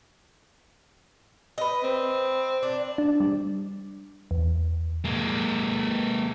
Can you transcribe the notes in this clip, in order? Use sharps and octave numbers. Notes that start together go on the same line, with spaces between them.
B4 D#5
C4
D4
D4
G3
E2
G#3 A#3